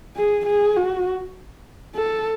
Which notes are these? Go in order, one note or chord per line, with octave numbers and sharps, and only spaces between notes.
G#4
G#4
F#4
A4